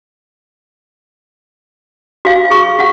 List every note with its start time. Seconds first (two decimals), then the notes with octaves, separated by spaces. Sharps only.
2.25 F#4 F5
2.50 G#4 C#6
2.79 F#4 F#5